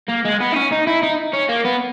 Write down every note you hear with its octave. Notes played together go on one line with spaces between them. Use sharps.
A#3
G#3
B3
D#4
C#4
D#4
E4
D#4
C#4
A#3
B3